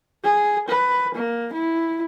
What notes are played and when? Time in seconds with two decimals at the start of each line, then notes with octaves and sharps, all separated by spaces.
0.24 G#4
0.68 B4
1.15 A#3
1.53 E4